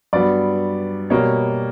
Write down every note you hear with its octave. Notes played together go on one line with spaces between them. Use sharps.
G2 F#3 B3 D5
B2 G3 A#3 C#5